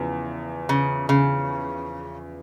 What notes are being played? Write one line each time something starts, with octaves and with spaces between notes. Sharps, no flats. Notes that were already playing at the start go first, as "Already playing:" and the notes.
Already playing: E2 C#3 F3
C#3
C#3